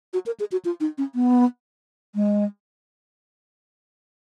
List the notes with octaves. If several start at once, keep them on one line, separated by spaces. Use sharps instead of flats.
F#4
A#4
G#4
F#4
F4
D#4
C#4
B3
G#3